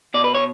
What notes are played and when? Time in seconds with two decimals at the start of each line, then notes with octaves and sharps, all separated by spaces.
0.14 B2 D5
0.24 B4
0.35 C#5